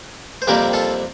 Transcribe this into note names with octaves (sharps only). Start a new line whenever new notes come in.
C5
F2 C3 G3 A#3 G4 A#4
F4 A4